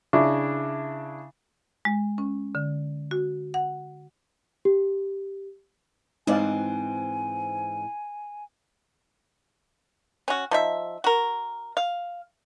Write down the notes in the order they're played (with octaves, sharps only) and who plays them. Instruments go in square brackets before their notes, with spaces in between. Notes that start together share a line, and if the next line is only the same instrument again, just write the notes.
[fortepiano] C#3 D4 E4
[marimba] G#3
C#4
D3
F#4
F#5
[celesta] G4
[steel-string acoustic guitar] G#2 E3 C4 [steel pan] D#4 D5 F5 [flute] G#5
[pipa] C#4 F#4
F3 D#4 E5
F#4 A#4
F5